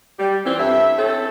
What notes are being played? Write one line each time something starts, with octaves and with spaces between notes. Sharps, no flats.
G3
E3 F3 C4
G2 A4 E5
C4 C#4 E4 A4